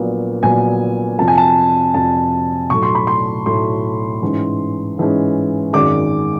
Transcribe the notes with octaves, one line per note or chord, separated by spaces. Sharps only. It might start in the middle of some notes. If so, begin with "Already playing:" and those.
Already playing: A#1 A#2 F#3 B3
A#1 A#2 F#3 B3 G#5
F2 C3 F3 A5
G#5
A5
F2 C3 F3 A5
B1 A2 F#3 A3 C#6
C6
B5
C6
B1 A2 F#3 A3 C6
G#2 E3 G#3 C#4
G#2 E3 G#3 C#4
G#1 F#2 D#3 G#3 D6